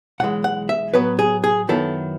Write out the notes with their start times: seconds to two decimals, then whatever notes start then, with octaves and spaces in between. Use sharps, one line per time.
0.20 B1 A2 E3 G#3 F#5
0.44 F#5
0.69 E5
0.94 A2 F#3 B3 B4
1.19 G#4
1.44 G#4
1.68 F#2 D#3 F#3 B3 E4 A4